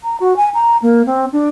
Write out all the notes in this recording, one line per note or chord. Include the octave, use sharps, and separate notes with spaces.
A#5
F#4
G#5
A#5
A#3
C4
D4